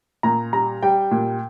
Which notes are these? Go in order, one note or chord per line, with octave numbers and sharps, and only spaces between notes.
A#2 A#5
G3 A#5
G3 G5
A#2